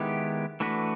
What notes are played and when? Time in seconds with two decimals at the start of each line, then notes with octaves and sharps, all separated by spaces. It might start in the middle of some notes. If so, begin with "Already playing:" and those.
Already playing: D#3 G#3 B3 E4 G4
0.60 E3 A3 D4 F#4 B4